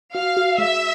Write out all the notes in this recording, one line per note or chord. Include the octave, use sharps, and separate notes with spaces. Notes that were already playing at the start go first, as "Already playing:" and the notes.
F#4 F5
F#4
G#3 E5